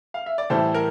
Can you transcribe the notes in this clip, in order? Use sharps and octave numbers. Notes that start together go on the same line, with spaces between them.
F5
E5
D5
A2 E3 G3 A4 C5
A#4